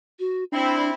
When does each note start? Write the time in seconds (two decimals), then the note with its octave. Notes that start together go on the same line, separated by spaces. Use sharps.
0.19 F#4
0.52 C4 D4 E4 B5